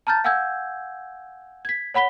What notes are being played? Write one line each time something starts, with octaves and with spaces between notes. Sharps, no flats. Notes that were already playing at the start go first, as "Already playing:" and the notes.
A5 A#5 F6 G6 A6
F5 F#5 G#5 E6 G6 G#6
G#6 B6
C#5 F#5 B5 B6 G7